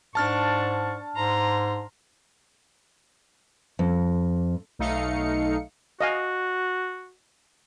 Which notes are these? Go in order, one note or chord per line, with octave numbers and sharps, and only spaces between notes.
G#2 D4 A5 C#6 F6 A6
G#2 A#5 C6
F2
B1 A3 D#4 F5 C#7
F#4 D#5 F5 G#5